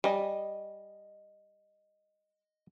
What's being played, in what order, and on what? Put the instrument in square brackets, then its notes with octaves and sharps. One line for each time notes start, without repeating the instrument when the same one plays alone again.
[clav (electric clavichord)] G3 [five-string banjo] D#5 G#5